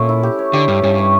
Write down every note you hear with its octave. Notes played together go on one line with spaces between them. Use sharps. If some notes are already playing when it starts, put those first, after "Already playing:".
Already playing: A#2 A3 C#4
E4
G4
C#5
D3 G4
G2 G4
G2 C#4
C#5